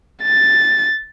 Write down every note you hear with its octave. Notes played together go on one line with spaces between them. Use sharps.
A6